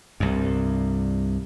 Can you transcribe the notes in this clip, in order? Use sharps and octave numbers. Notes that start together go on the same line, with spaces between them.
C2 G2